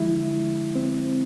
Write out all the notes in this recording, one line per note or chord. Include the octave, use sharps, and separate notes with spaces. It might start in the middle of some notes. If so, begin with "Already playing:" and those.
Already playing: D3 F3 G#3 E4
C4